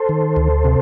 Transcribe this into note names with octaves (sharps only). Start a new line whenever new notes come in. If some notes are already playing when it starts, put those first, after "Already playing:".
Already playing: A4 C5
D#3
D2
C3